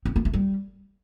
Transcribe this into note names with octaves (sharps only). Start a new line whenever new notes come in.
C4
B3
A3
G3